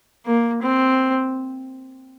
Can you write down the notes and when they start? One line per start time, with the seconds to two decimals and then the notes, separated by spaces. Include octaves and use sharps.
0.26 A#3
0.62 C4